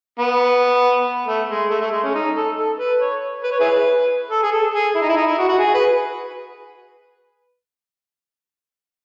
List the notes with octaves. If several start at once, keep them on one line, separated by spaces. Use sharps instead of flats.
B3
A3
G#3
A3
A3
G#3
C#4
D#4
A4
A4
B4
C#5
B4
C#5
E4 G#4 B4
A4
G#4
A4
G#4
E4
D#4
E4
D#4
E4
F#4
F#4
G#4
B4